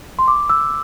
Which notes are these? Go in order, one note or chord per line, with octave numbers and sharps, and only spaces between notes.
C6
D6
E6